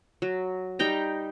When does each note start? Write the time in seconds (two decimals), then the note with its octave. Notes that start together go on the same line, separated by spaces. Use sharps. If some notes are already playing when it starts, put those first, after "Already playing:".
0.22 F#3
0.79 G3 D#4 G5 A#5